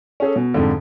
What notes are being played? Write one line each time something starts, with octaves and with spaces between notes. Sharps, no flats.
C#4 G#4 A4
B2
F2 G#2 D3